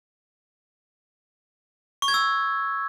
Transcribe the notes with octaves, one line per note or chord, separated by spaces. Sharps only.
C#6
G#6
E6